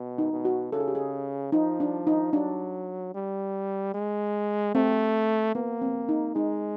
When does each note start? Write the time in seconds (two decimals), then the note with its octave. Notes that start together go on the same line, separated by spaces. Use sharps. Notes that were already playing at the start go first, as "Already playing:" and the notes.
Already playing: B2
0.18 D#4
0.32 B2
0.45 F#4
0.72 C#3 A4
0.80 G#4
0.88 G4
0.95 G#4
1.52 F3 D#4
1.80 D4
2.07 D#4
2.33 F#3 D4
3.14 G3
3.94 G#3
4.75 A3 C4
5.55 A#3 B3
5.82 C4
6.09 D#4
6.35 G#3 D#4